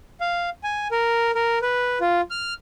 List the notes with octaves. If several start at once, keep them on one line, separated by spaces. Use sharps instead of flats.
F5
G#5
A#4
A#4
B4
F4
F6